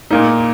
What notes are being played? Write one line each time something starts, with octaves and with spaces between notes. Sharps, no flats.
A#2 A#3 D#4